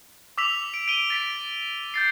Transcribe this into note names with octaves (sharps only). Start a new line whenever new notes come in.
D6 E6 B6 F7
D7
D7 D#7 G7
A6 B6 D7
G6 A6 C7